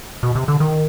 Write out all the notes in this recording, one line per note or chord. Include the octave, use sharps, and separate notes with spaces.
B2
C3
D3
D#3